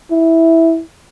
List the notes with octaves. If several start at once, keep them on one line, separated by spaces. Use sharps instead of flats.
E4